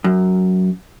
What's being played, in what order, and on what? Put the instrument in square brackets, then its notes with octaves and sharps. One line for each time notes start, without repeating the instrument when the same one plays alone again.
[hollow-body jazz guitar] F#2